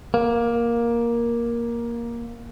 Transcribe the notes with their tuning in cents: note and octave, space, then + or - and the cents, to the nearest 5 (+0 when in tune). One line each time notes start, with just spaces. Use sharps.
A#3 +10